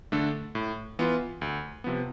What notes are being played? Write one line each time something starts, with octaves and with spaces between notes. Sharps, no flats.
D3 A3 D4 A4
A2
E3 B3 F4
D2
C3 F3 B3